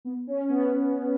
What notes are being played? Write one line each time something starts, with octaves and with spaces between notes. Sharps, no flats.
B3
C#4
B3